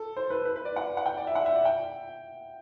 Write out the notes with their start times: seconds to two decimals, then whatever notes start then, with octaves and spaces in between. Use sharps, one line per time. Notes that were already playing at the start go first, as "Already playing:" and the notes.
Already playing: A4
0.17 C5
0.30 B4
0.45 B4
0.56 B4
0.65 D5
0.76 F#5
0.97 F#5
1.06 G5
1.18 D5
1.27 E5
1.35 F#5
1.46 E5
1.56 D5
1.65 G5